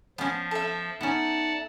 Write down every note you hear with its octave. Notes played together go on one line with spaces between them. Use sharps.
F3 B3 C#4 D4
A4 E5
B3 C#4 D#4 D5 F#5 A5